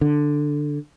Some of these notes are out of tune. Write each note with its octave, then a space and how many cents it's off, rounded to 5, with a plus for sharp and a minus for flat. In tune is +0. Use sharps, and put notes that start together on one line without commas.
D3 +5